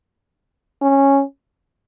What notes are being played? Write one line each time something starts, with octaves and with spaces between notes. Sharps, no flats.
C#4